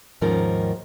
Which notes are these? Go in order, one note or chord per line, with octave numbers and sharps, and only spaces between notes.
D#2 G#2 D#3 F3 C#4 A#4